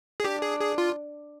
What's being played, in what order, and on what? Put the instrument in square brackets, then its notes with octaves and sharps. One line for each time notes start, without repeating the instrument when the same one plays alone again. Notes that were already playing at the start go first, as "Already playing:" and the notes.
[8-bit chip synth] G#4
[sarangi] D4 [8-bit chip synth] G4
[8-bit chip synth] G#4
G#4
F4